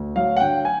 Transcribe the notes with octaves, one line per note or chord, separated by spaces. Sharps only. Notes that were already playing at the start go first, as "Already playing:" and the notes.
Already playing: D2
F#3 F5
F#5
D3 G5
G#5